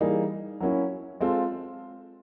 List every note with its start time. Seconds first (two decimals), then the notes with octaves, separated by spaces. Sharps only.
0.01 E3 G3 A#3 D#4 G#4
0.60 F#3 A#3 C#4 E4
1.21 G#3 C4 F4 A4